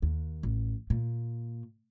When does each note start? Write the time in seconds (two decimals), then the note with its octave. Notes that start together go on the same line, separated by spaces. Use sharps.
0.02 D#2
0.43 A1
0.90 A#2